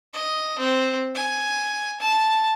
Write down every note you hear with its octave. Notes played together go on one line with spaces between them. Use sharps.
D#5
C4
G#5
A5